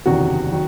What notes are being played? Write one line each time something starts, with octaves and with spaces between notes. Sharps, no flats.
F#1 E2 C3 D#3 F#3 F#4
D#3 F#3